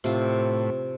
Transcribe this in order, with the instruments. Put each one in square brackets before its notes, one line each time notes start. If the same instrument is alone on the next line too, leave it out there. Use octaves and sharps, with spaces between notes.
[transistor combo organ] A2 [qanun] C3 F4